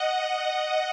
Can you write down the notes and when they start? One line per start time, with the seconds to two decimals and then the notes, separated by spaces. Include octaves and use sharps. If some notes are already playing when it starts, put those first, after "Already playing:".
Already playing: D#5 F#5
0.36 D#5 F#5